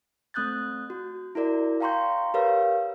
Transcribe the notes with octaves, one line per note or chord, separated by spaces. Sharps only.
A3 C4 D#6 F#6 G6 A6
F#4
E4 F#4 A#4 D5
F5 G5 A#5 C6 C#6 G6
G4 A#4 B4 C#5 F5